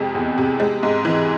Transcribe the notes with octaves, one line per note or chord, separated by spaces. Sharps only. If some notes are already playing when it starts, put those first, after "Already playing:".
Already playing: F2 C3 G#3
E2
C3
G#3
G#2
E3